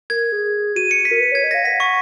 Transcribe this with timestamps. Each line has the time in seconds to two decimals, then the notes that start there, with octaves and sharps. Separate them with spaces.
0.10 A#4 G#6
0.32 G#4
0.76 F#4 D#7
0.91 C#7
1.05 B6
1.11 A#4
1.20 B4
1.32 C#5 G#6
1.44 D#5
1.51 A#6
1.55 F5
1.65 F#5 B6
1.80 C#6